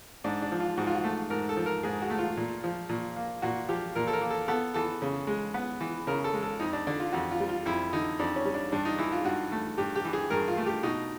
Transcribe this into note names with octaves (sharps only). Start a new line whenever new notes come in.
G#2 D4
D4
F3
F4
G#2 F#4
F4
F#4
A3
G#2 A#4
A4
F3
A#4
G#2 G#4
F#4
A3
F4
A#2
F3
A#2
A#3
A#2 F#4
F3 G4
A#2 A#4
A4
A#4
A#3
A4
B3 A4
E3 A4
C#3
G#3
B3
E3
C#3 A#4
A4
G#3
A4
F2 D#4
D4
D3 D4
F4
F2 F#4
F4
G3
F4
F2 E4
D3 D#4
F2 D4
C#4
G3
D4
G2 D4
D#4
E3 E4
F4
G2 F#4
A3
G2 G4
G4
E3
G#4
G2 A#4
F4
A3
G4
B2 D#4